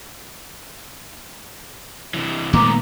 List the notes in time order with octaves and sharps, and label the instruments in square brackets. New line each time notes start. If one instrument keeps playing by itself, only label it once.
[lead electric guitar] C3 E3
[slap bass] A#2 D#3 A3 [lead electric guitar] G#3 B3 [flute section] A#5 D6